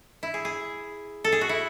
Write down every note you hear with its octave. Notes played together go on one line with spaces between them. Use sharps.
E4
G#4
G#4
A4
G#4
F#4
E4